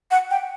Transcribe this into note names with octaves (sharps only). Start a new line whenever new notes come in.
F#5
G5